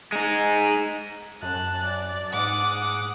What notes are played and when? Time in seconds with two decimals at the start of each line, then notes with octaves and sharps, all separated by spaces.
0.12 G#3 D#4
1.43 F#2 A5 F#6
1.85 D5
2.34 G#2 F#5 D6 D#6